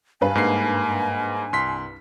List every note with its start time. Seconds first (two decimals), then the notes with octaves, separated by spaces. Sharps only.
0.21 G2 B4 F5 G#5
0.35 G#2 A#3 C7
1.53 C2 C6 B6